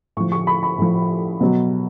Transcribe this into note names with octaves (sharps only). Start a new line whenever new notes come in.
A2 F3 C#6
C#6
B5
B5
A2 F3
B2 F#3